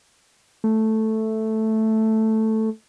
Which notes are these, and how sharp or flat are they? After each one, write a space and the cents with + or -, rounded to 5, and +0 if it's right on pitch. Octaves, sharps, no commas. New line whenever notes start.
A3 +0